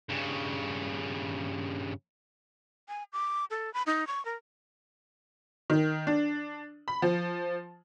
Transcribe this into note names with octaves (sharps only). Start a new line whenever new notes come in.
G2 C#3
G#5
D6
A4
B5
D#4
C#6
A#4
D#3
D4
B5
F3